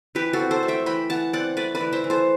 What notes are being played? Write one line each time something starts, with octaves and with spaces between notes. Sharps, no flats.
E3 G4 B4
F#4 A4
C4
A4 C5
A3
E5 G5
E3 G5 B5
E3 F#5 A5
C4 D5 F#5
A3 B4 D5
B4 D5
E3
C5 E5
E3
A4 C5